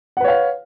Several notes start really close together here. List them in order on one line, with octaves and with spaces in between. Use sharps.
F#5 B4 C#5 F5